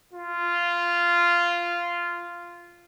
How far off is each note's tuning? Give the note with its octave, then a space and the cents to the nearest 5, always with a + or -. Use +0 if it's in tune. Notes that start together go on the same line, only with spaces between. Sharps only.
F4 -10